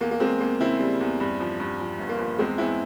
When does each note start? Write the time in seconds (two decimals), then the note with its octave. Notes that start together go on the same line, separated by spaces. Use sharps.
0.01 E2 A#3
0.11 A#3
0.20 E2 G#3 C4
0.40 E2 A#3
0.60 C#3 C4 E4
0.80 G3
1.01 E2
1.20 G2
1.40 F3
1.60 G2
1.80 F3
1.99 G1
2.09 A#3
2.19 F3
2.39 E2 G#3 C4
2.58 E2 C4 E4